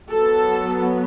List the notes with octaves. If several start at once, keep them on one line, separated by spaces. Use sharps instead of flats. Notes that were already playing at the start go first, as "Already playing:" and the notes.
F#3 B3 A4